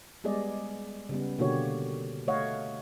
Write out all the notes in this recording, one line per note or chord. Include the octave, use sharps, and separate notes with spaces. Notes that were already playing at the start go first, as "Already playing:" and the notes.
G3 G#3 B3 G#4 D5 D#5
C#3 G3 B3
B2 D3 A#3 F#4 G4 C#5
A3 C#5 D#5 F5 F#5